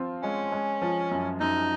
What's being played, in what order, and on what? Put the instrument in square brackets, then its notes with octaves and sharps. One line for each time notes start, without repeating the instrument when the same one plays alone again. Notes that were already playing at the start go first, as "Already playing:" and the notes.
Already playing: [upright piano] F3 C4 F4
[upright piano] G#3 [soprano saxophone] C#4
[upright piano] G#3
F3
F#2
[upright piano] F#2 [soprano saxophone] D#4